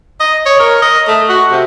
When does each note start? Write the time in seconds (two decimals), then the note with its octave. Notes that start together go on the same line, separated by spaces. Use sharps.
0.20 D#5
0.46 C#5
0.60 A#4
0.82 D#5
1.08 A3
1.29 F#4
1.51 C3